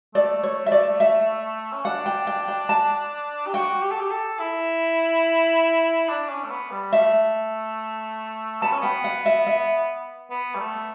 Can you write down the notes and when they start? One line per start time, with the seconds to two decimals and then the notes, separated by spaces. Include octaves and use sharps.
0.15 A3 D5
0.43 C#5
0.66 E5
0.72 D5
1.00 E5
1.72 C#4
1.85 D4 F#5
2.06 G5
2.27 G5
2.48 G5
2.69 A5
3.47 G4
3.54 F#4 G5
3.83 G4
3.91 A4
4.00 G4
4.11 A4
4.39 E4
6.09 D4
6.29 C#4
6.44 A3
6.50 B3
6.71 G3
6.93 A3 E5
8.62 B3 A5
8.72 C#4
8.82 B3 G5
9.04 F#5
9.26 E5
9.47 E5
10.31 B3
10.55 G3
10.59 A3